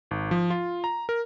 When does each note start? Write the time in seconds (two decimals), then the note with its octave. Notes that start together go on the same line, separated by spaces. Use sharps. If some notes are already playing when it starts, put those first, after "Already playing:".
0.11 G#1
0.31 F3
0.50 F4
0.84 A#5
1.09 A#4